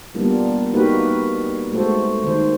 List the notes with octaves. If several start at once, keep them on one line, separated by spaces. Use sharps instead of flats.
G3 A#3 B3 D4 F4
A#3 D#4 F#4 G4 A#4 B4
G#3 A3 F#4 A4 C5
D#3 C5